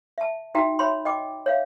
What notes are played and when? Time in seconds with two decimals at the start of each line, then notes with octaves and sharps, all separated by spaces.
0.18 E5 A5
0.55 D#4 F#4 E5 G5 A#5
0.79 C#5 E5 B5 C6
1.05 D#5 G5 D6
1.46 C#5 E5 F5